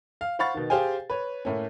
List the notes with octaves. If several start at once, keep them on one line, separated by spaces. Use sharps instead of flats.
F5
C5 F5 F#5 B5 C#6 A6
B2 D#3
G4 G#4 C5 F5 G5 G#5
B4 C#5
A2 A3 A#3 C#4